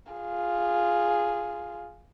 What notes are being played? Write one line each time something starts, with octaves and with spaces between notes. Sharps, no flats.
F4 G#4